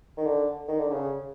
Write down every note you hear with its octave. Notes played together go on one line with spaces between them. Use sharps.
D#3
D3
D#3
D3
C#3